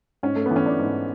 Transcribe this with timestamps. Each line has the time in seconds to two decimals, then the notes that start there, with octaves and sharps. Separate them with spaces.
0.23 G#2 C#4
0.36 A3
0.46 B3
0.51 E3 C#4
0.66 D4
0.79 G#2